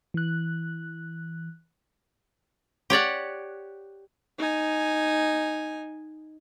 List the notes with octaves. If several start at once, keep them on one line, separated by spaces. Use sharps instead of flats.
E3 F#6
G4 C#5 D5 F#5
D#4 G#5